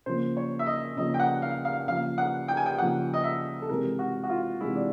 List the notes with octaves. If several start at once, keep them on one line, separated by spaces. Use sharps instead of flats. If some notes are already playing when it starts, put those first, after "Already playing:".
C#3 F3 A#3 C5
C#5
E5
D#5
C#3 F3 A#3 D#5
G5
F#5
F5
F5
C#3 F3 A#3 F5
F#5
G5
G#5
G5
C#3 F3 A#3 F#5
D#5
E5
A4
C3 E3 G#3 A#4
F#4
F#4
F4
C3 E3 G#3 E4
D4